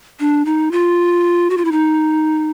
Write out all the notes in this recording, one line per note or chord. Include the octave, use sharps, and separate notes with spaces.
D4
D#4
F4
F#4
F4
E4
D#4